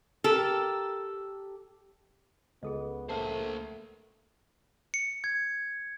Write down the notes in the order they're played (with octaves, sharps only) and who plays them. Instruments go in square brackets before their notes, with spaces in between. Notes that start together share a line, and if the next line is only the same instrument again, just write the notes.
[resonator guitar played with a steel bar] G4 A4 A#4
[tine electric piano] C#2 [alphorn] B3 [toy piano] G#4 A4 D#5
[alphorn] A3 [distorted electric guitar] A#3 C5 [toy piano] B4 A5
[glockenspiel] C#7
G#6